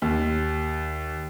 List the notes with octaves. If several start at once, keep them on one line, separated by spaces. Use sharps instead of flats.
D#2